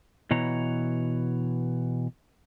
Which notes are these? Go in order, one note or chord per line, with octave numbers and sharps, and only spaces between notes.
B2 E3 C#5 A#5